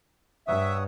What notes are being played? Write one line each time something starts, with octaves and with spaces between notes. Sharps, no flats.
G2 C#5 E5 F#5 D#6